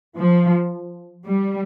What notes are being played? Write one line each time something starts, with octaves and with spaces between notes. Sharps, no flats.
F3
G3